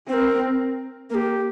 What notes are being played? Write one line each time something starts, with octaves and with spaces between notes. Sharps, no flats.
C4 C5
A#4
A#3 G4 A#4